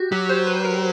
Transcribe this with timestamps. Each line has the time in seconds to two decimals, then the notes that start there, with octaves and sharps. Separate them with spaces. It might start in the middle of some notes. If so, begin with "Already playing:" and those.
Already playing: F#4 G4
0.12 F#3 G4
0.29 C5
0.47 B4
0.64 A#4